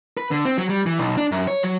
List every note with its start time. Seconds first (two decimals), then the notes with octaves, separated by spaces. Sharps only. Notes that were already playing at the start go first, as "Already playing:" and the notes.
0.17 B4
0.31 D3
0.45 C4
0.58 F#3
0.69 G3
0.86 E3
0.98 B1
1.17 D4
1.32 F#2
1.47 C#5
1.63 F#3